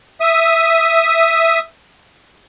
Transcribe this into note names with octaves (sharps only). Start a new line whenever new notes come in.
E5 D#6